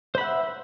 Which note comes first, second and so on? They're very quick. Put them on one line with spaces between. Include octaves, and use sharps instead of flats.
C5 B5 F#5 E5